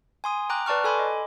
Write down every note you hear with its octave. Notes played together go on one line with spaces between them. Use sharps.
G#5 C6 D#6
G5 A#5 D6 F#6
B4 D5 A5 C#6 F6
A4 G#5 B5 C6 D6
D#5